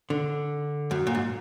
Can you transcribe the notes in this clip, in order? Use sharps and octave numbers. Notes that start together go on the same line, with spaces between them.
D3
F#2
A#2
G#2